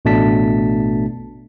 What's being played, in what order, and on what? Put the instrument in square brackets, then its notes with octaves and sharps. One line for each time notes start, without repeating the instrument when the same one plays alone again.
[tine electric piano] A1 B2 A3 D4 A5 B6